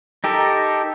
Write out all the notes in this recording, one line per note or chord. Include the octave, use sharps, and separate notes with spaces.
D#4 G4 A4 A#4